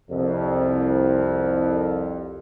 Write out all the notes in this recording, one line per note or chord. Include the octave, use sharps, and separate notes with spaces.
C2 F2